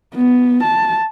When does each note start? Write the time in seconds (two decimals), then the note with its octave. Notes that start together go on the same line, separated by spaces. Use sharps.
0.15 B3
0.63 A5